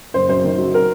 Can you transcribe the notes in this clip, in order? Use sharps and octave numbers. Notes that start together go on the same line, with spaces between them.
F#1 C5
F#2 C5
D#3
F#3
A#4